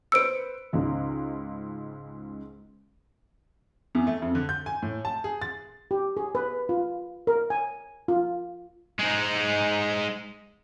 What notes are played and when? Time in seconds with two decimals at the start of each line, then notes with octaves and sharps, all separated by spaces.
0.12 B4 C5 E6 C#7 D7
0.73 C#2 G#2 C#3
3.95 E2
4.07 A3
4.22 F2
4.35 D3
4.49 G6
4.66 G#5
4.82 A2
5.05 A5
5.24 G#4
5.42 A6
5.91 G4
6.17 G#4
6.35 B4
6.69 F4
7.27 A#4
7.50 G#5
8.08 F4
8.99 G#3 D#4